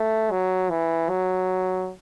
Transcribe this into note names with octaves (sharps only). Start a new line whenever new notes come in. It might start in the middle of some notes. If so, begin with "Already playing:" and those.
Already playing: A3
F#3
E3
F#3